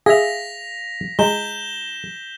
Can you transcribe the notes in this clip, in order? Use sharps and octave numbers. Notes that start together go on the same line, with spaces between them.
G#4 E5 F5 A#6 B6 F7
G#3 E4 G6 E7 G7